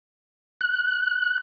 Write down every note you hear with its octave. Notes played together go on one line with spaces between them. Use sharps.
F#6